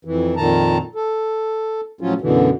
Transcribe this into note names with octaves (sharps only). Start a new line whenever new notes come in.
F2 E3
F2 A#2 D#3 A5 A#5
A4
A2 F3 F#3 C#4 F4
F#2 B2 D3 E3